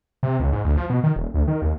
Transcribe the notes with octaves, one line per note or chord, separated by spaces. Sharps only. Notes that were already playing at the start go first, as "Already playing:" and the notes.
C3
C#2
G#2
D2
F3
B2
D#3
D#1
D2
D#3
D#2